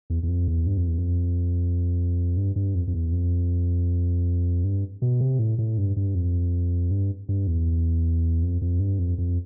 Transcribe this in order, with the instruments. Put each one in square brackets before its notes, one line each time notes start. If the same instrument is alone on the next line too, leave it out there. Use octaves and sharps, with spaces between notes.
[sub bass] E2
E2
F2
E2
G2
F2
E2
F2
G2
G2
F2
F2
E2
F2
G2
B2
C3
A2
A2
G2
G2
F2
G2
G2
E2
F2
F2
G2
F2
F2